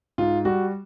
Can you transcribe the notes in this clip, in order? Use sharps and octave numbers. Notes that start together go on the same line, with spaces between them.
G#2 F4
G3 F#4